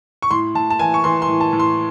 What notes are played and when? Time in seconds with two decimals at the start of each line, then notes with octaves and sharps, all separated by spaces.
0.22 C#6
0.31 A2 C6
0.55 A2 A5
0.70 A5
0.79 E3 G#5
0.94 C#6
1.04 E3 C6
1.22 C6
1.28 A2
1.41 A5
1.53 A2
1.60 C6